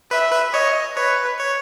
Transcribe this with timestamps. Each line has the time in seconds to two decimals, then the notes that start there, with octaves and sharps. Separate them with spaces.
0.11 B4 E5
0.32 B4
0.53 C#5 D#5
0.96 B4 C#5
1.39 C#5